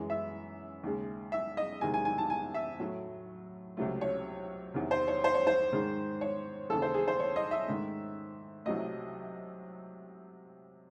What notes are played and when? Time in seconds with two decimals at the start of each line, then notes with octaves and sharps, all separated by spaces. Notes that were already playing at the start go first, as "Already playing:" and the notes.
Already playing: F#2 E3 G#3
0.10 E5
0.83 D#2 C#3 G#3
1.32 E5
1.57 D#5
1.81 E2 C3 D#3 G#3 G#5
1.94 G#5
2.05 G#5
2.18 A5
2.30 G#5
2.54 E5
2.79 A2 F#3 A3
3.77 C#2 C3 F#3 A3
4.01 C#5
4.74 E2 C3 D#3
4.91 C5
5.08 C#5
5.24 C5
5.34 C#5
5.47 C5
5.73 G#2 D#3 G#3
6.21 C#5
6.70 D#2 C#3 E3 A4
6.82 C5
6.94 G#4
7.08 C5
7.19 C#5
7.36 D#5
7.51 E5
7.68 G#2 D#3 A3
8.65 C2 C3 F#3 A3 D#5